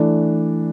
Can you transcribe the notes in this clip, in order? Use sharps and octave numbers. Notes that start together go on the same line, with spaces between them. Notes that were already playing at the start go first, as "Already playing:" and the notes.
Already playing: E3 A3 D4